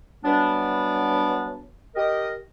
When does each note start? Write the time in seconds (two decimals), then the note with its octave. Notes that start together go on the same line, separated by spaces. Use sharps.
0.24 E3 F#3 G3 B3 D4
1.95 G4 A#4 D#5